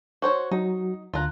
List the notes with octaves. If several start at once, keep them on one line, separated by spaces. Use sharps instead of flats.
F#4 C5 C#5
F#3 D#4 F#4
D2 D3 F4 A#4 F#6